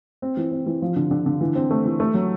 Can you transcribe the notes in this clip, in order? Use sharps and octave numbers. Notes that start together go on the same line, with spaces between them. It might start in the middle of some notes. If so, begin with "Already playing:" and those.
C4
E3
C4
E3
F3
D3
D3
D3
E3
C4
A3
E3
A3
F#3